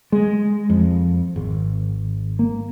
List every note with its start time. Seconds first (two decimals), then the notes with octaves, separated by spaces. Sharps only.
0.12 G#3
0.70 F2
1.36 G#1
2.39 A#3